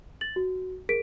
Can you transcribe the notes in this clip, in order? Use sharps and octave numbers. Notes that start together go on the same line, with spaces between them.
A6 F#7
F#4
G#4 A#4 B6 D7